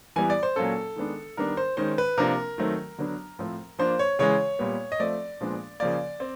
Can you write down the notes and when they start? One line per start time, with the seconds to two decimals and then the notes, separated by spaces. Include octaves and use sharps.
0.16 E3 G3 B3 G#5
0.30 D5
0.43 C5
0.56 A#2 F#3 A#3 C#4 A4
0.96 D#3 G#3 B3 D4
1.37 D#3 G3 B3 D4 A#4
1.57 C5
1.77 D#3 G#3 C#4 C5
1.98 B4
2.18 C3 F3 A#3 D4 A#4
2.58 D#3 F#3 A3 C4
2.98 D3 F#3 B3 D4
3.39 A2 F3 A3 C4
3.79 F3 A#3 D4 C5
3.99 C#5
4.19 C#3 E3 G#3 C#5
4.59 A#2 G3 B3
4.92 D#5
5.00 F3 A3 C4 D5
5.40 A#2 F3 G#3 B3 D4
5.80 C#3 F3 A#3 D5
6.20 C4